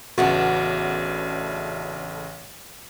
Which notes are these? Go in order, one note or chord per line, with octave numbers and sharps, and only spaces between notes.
A1 C#3 A3 B3 D4 F#4